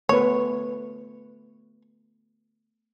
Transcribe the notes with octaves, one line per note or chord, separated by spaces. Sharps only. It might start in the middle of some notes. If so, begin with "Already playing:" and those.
A3 B3 B4 C#5